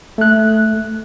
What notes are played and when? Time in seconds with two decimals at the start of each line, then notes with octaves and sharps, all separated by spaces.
0.18 A3 F#6